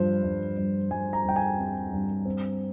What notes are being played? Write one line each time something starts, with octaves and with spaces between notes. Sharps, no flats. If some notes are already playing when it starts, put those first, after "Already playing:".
Already playing: G2 F3 C5
G2
G2
G2 G#5
A#5
G2 G5
G#5
C4
G2
C4